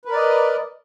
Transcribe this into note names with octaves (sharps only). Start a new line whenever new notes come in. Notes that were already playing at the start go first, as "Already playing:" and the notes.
A#4 B4 D5 D#5